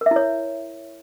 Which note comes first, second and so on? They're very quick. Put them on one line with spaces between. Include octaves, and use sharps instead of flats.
A#4 E5 E4 C#5